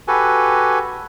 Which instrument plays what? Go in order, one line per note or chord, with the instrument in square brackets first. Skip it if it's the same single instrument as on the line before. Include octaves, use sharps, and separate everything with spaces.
[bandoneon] F#4 G4 A4 B4 G#5